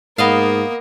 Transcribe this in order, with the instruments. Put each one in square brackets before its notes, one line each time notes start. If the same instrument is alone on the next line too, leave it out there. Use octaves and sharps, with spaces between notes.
[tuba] G#2 [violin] A#3 [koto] B3 D#5 F5